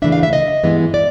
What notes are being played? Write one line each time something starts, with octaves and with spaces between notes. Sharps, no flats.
C#3 E3 A3 D4 E5
F5
E5
D#5
G2 E3 G#3 B3 E4
D5